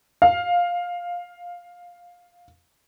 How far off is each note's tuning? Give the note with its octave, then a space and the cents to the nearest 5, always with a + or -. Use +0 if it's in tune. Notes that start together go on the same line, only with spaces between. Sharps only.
F5 +10